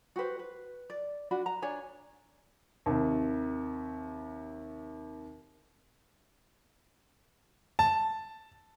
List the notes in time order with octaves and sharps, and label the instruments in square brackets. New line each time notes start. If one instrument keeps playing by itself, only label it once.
[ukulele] F#4 G4 B4 C5
B4
D5
D4 F#4 B5
A#5
D4 C#5 G#5
[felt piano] D#2 C3
[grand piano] A5